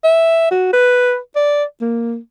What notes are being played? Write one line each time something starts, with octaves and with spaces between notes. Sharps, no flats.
E5
F#4
B4
D5
A#3